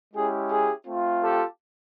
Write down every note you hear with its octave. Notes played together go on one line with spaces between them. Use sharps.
G#3 C#4 E4 G4 G#4
G#4
A3 C4 F4
G4 A4